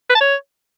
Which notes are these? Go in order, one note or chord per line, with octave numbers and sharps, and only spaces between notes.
B4
A5
C#5